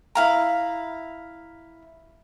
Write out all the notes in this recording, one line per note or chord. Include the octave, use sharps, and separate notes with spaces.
E4 F5 A#5